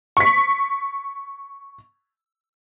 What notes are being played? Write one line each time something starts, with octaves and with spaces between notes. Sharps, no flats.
C#6 B6